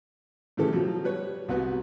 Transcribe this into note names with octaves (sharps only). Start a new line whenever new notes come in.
A2 C#3 E3 G4 A4
B2 F3 F#3
G3 B4 C#5
C2 B3 F#4 B4